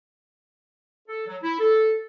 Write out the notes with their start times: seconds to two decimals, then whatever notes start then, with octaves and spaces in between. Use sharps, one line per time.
1.08 A4
1.28 F#3
1.43 E4
1.60 A4